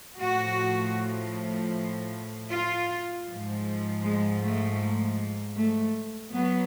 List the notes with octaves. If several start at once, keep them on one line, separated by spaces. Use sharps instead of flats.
A2 F3 F#4
F4
G#2 F3
G#3
A3
A3
F#3 B3